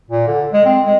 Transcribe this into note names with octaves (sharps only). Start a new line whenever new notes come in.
A#2
D3
G#3
C4
G#3